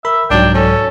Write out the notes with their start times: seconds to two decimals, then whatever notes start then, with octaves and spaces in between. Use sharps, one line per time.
0.05 A#4 E5 B5
0.30 C2 G#2 F#3 D4 G5
0.54 C#4 A4